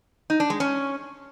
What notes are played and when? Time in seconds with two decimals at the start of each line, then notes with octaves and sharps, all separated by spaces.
0.30 D#4
0.40 D4
0.50 G#3
0.60 C#4